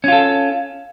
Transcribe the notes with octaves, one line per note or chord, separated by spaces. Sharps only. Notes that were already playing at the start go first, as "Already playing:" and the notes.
C#4 F4 A4